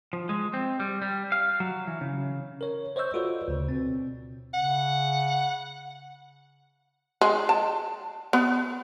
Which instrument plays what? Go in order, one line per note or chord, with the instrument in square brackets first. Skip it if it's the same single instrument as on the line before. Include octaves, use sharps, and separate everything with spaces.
[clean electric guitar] F3
G#3
C4
G3
G3
F5
F#3
E3
C#3
[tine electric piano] A#4 C#5
C5 C#5 D#5 C#6 E6 G6
F4 F#4 A4 B4 C5 D5
D2 C#3
B2 C4
[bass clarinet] C#3 [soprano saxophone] F#5
[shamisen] G#3
A5
B3